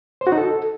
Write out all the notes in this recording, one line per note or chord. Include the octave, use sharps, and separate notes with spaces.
C5
F#4
D#4
A4